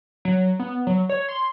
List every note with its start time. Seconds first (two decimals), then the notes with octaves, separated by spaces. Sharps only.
0.25 F#3
0.59 B3
0.87 F#3
1.09 C#5
1.29 C6